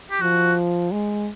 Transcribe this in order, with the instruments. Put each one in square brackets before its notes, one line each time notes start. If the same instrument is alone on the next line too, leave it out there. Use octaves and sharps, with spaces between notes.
[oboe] G4
[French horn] F3 [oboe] F#4
[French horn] G#3